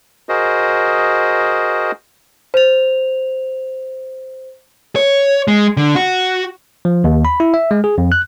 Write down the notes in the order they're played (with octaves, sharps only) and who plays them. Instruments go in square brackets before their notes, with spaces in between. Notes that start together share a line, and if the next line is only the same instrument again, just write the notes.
[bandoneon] F#4 G#4 A#4 C5 D#5
[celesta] C5 F7
[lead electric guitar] C#5
G#3
D3
F#4
[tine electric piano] F3
D#2
B5
E4
E5
G#3
G#4
F2
F#6